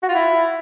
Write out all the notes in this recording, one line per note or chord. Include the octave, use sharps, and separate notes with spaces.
F#4
F4
E4